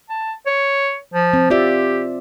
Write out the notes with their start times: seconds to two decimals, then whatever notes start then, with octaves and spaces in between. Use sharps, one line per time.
0.10 A5
0.46 C#5
1.14 F3
1.33 C4
1.50 F4 G4 D5 E5